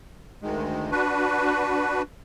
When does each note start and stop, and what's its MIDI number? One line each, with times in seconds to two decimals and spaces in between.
0.42 0.91 38
0.42 0.91 51
0.42 0.91 56
0.92 2.02 62
0.92 2.02 66
0.92 2.02 71